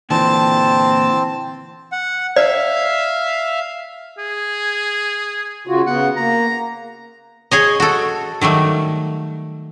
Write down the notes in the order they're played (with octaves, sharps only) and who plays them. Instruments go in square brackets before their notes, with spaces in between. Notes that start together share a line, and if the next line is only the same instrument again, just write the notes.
[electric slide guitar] A#2 D3 E3 [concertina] C4 [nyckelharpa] A5
[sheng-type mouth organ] F#5
[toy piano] D5 [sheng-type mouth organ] E5 F5
[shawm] G#4
[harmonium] C#3 F4 F#4
[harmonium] C#3 B3 [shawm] F#5
[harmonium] A#3 [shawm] A#5
[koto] G#4 C#5 D#5
F#4 A4
D#3 F#3 G3 A3